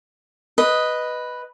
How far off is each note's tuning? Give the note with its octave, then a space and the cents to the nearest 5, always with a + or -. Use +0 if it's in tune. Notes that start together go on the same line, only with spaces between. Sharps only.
B4 +0 D#5 +0